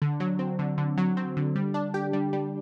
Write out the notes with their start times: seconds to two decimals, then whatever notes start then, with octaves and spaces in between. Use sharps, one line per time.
0.02 D3
0.20 F#3
0.39 C4
0.59 D3
0.78 D3
0.98 F#3
1.17 C4
1.37 D3
1.56 G3
1.74 D4
1.94 G4
2.13 G3
2.33 G3